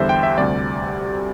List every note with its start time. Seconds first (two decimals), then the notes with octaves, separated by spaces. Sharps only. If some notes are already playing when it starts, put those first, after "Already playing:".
Already playing: E2 D3 G3 C5 E5
0.09 G5
0.23 E5
0.38 D2 C3 G3 D5